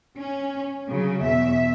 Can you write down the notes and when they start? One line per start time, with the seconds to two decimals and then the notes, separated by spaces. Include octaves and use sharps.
0.17 C#4
0.88 C#3 F#3
1.23 E2 B2 E5